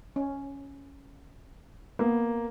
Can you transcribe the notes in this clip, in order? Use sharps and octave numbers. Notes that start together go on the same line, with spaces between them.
C#4
A#3 B3